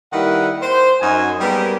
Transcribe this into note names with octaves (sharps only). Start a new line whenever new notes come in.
D#3 G3 A#3 E4 B4 F#5
C5
F#2 D#4 G#5
G3 G#3 A#3 B3 G4 A#4